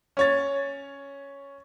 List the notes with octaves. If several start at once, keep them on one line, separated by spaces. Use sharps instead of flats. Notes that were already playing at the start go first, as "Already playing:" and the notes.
C#4 C#5 A6